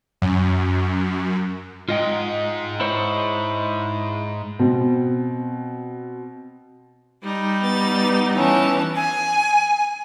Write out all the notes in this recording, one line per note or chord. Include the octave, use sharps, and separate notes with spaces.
F#2
G#2 F4 D#5 G5
E4 C5 C#5
B2 C4
G3 D#4
B3 A6
E3 C#4 A5
G#5